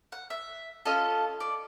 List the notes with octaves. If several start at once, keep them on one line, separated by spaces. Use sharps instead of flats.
F#5
E5
C#4 F4 A4 D#5
D5